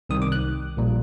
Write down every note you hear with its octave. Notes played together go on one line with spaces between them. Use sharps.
C2 C3 D#3 G3 D#6
D6
F#6
A#1 A#2 G3